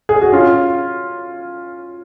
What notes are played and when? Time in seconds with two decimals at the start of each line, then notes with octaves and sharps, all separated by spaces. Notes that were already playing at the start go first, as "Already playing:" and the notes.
0.09 G#4
0.21 F#4
0.32 C#4 F4